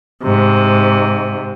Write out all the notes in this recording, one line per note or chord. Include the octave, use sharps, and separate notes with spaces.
G#2 C3